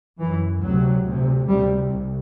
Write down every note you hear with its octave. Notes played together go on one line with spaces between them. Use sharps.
F#2 E3
D2 C3 F#3
D2 C3
D2 C3 G3
C2